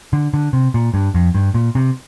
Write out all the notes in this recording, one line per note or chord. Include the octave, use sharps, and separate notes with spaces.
D3
D3
C3
A#2
G2
F2
G2
A#2
C3